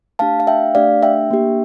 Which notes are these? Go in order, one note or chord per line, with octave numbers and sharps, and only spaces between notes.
A3 D4 G4 F5 A5
F5
E5 G5
A3 D4 G4 D5 F5
E5 G5
A#3 D4 G4